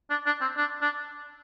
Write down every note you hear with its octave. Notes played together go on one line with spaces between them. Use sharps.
D4
D4
C4
D4
D4